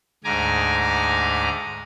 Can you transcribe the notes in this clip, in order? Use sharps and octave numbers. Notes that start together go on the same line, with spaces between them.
D2 G#2 G#5 A#5 D6